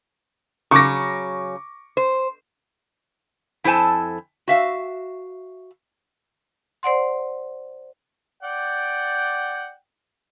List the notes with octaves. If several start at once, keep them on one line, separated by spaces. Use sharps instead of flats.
C#3 F#3 C#6 D6 A#6
C5
F2 E4 A4 C5 G#5 A5
F#4 E5 F5
C5 D5 F#5 C6
D5 F#5 G5